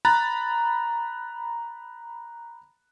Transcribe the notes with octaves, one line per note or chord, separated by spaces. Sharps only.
A#5 B5 F#6 A6